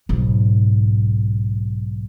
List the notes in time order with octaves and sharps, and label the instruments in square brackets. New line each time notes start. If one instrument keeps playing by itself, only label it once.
[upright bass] B1 G#2